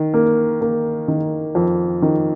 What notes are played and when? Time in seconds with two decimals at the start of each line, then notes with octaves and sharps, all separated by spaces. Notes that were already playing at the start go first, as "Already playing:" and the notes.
Already playing: D#3
0.14 A#3
0.61 A#3
1.08 D#3
1.55 F2
2.02 D#3